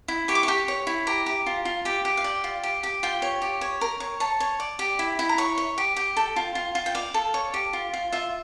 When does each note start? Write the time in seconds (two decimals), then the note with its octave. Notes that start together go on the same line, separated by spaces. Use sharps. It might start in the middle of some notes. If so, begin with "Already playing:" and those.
0.08 E4
0.28 G4 C#6
0.35 D6
0.43 G4 C#6
0.68 C#5
0.87 E4
1.07 G4 A#5
1.26 G4
1.46 F4
1.65 F4
1.85 G4 G5
2.05 G4
2.17 F5
2.24 D5 G5
2.44 F4
2.63 G4
2.83 G4
3.03 F4 G5
3.22 C#5
3.42 G4
3.61 C#5
3.81 A#4
4.00 C#5
4.20 C#5 A5
4.40 C#5
4.60 D5
4.79 G4
4.99 E4
5.19 E4
5.29 A#5
5.38 C#5 C#6
5.58 C#5
5.78 G4
5.96 G4
6.17 A4 G5
6.36 F4
6.55 F4
6.75 F4
6.86 G5
6.95 D5 F5
7.14 A4
7.34 C#5
7.54 G4
7.73 F4
7.94 F4
8.12 F4 E5